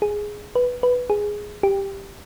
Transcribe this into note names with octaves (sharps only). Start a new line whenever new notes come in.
G#4
B4
B4
G#4
G4